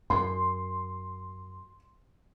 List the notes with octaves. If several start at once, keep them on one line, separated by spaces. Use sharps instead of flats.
F#2 C6